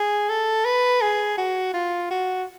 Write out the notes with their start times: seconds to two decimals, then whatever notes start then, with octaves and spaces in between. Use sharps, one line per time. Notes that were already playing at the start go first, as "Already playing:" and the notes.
Already playing: G#4
0.29 A4
0.65 B4
1.01 G#4
1.38 F#4
1.73 F4
2.10 F#4